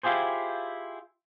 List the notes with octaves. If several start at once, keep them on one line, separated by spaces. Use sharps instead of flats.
E4 F4 G4 G#4 C5